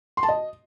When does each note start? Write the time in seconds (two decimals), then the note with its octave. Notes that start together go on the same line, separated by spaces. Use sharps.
0.17 C6
0.23 A5
0.29 D#5